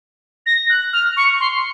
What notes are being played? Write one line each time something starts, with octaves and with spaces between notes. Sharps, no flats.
A#6
F#6
F6
C#6
C6